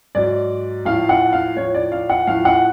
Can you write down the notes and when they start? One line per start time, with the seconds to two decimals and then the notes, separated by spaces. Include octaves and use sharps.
0.15 G#2 F#3 D5
0.85 A2 F3 F5
1.09 F#5
1.33 F5
1.56 A2 F3 C#5
1.74 D5
1.92 F5
2.10 F#5
2.27 A2 F3 F5
2.45 F#5